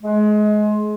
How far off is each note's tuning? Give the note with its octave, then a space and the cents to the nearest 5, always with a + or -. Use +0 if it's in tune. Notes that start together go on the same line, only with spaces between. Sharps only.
G#3 +25